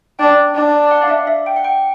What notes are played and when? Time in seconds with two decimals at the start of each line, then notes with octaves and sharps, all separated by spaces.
0.19 D4 G5
0.55 D4
0.91 F#5
1.02 F5
1.09 E5
1.27 E5
1.46 G5
1.56 F#5
1.64 G5